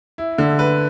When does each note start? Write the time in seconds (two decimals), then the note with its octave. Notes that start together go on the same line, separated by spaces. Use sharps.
0.18 E4
0.38 D3
0.59 B4